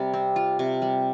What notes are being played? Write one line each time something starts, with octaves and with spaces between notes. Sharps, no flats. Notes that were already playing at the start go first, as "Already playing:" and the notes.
Already playing: C3 G3
C4
F4
C3
G3